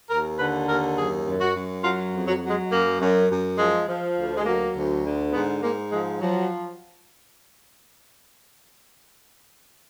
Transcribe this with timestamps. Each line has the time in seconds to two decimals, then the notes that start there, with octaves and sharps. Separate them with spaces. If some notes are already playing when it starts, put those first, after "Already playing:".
0.09 D#2 A#4
0.39 D3 B4
0.68 D#2 A#4
0.97 F#2 G#4
1.25 F#2
1.41 F#4
1.55 F#2
1.84 F#3 F4
2.13 F2
2.27 F#3
2.43 F#3
2.49 G#3
2.71 F#2 A#3
3.00 F#2
3.30 F#2
3.58 F3 G#3
3.88 F3
4.17 D2
4.37 G#3
4.46 F#3 A#3
4.76 D2
5.04 D3
5.33 G#2 B3
5.62 G#2 A#3
5.92 F3 G#3
6.21 F3 F#3